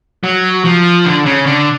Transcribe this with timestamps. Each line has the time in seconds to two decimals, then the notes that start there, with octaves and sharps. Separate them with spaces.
0.23 F#3
0.65 F3
1.05 D3
1.26 C#3
1.46 D3